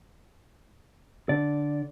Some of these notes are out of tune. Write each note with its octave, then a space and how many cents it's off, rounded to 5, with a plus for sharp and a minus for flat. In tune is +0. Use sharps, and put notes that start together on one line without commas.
D3 +0 D5 -10